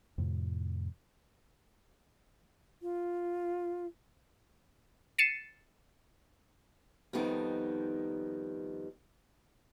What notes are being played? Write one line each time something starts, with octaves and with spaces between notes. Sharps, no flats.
F2 A2 C3
F4
A6 C7 C#7 D#7 E7
F2 D#3 G3 B3 D#4